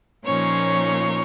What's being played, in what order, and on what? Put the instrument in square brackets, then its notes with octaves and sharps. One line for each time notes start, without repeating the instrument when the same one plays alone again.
[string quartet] A#2 F3 A#3 C#4 D#4 C#5